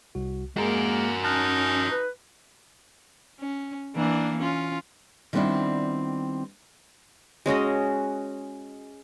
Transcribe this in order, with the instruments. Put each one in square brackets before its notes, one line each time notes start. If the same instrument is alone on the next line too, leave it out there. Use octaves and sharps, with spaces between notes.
[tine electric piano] C2 F#4
[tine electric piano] G#3 G#4 [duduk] A#3 [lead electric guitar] F#4 A#4
[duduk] C#4 [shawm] D#4 [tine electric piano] A5 F6 F#6
[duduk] B4
[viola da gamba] C#4
E3 A#3 D4
C#4 F4
[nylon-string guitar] D#3 G3 B3 C4 D4 E4
[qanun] G#3 C#4 F#4 D#5